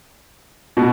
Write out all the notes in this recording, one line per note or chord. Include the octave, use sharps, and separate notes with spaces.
B2